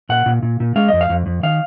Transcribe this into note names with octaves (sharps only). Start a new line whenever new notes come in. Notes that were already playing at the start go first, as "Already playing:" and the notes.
A#2 F#5
A#2
A#2
A#2
G#3 F5
F2 D#5
F5
F2
F2
D#3 F5